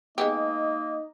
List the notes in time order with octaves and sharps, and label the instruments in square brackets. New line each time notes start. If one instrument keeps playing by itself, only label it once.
[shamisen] G#3 B3 G4 [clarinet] A#3 [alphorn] D#4 [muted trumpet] D#5